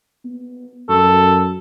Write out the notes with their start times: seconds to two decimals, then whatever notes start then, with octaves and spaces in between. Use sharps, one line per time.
0.25 B3
0.89 F#2 A4